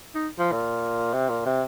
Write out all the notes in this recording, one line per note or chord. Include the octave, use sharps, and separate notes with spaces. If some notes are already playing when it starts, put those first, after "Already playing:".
D#4
F3
A#2
C3
A#2
C3